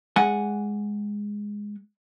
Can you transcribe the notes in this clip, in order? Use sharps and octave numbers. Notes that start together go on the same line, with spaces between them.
G#3 F#5 G#5